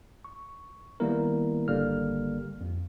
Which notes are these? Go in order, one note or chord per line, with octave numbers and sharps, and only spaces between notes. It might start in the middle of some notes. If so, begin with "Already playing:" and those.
C#6
D#3 G3 A#3 B3 E4 A#4
G#1 D3 G3 A#3 F6
F2